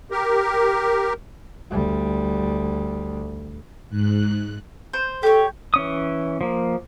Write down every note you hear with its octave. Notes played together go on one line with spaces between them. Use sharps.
G4 A#4
D2 G3
G#2 F#6
C5
G4 A4 C#5
E3 C#4 D#6
F3 A#3